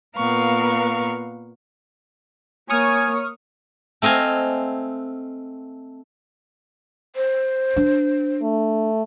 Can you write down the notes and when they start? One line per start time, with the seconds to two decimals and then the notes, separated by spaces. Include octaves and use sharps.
0.17 A#2 B3 A#4 B4 F5 C#6
2.70 A#3 C#5 G#5 C#6 D#6 F6
4.02 A3 C4 D#5 F5 G#5
7.16 C5
7.76 D4
8.42 A3